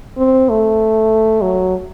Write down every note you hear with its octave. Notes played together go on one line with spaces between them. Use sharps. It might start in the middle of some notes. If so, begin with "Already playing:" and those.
C4
A3
F#3